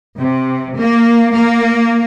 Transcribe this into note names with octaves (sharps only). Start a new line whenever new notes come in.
C3
A#3
A#3